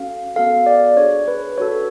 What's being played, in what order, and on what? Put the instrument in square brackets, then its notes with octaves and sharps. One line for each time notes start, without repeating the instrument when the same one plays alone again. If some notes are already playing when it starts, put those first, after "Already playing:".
Already playing: [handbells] C#4 F#4 A4 F5
B3 F#4 A4 F5
D5
D4 G#4 C#5
B4
D4 F#4 A4 C#5